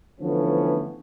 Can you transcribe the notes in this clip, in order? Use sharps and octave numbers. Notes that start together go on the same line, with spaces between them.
D3 E3 F3 A3 B3 C#4